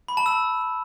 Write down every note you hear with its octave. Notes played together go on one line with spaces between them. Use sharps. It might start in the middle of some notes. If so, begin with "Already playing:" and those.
B5
A5
E6